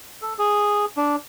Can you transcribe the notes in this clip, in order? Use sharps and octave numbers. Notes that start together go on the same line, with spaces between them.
A4
G#4
D4